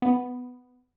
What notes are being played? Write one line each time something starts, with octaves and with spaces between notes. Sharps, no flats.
B3